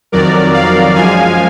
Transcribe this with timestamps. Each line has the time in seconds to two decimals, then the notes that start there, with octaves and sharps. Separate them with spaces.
0.12 F2 D#3 F#3 A#4 D5
0.54 D5 F5
0.95 F#2 F3 G#3 F5 G#5